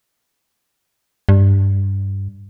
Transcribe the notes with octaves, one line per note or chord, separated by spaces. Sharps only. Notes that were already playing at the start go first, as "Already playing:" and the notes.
G2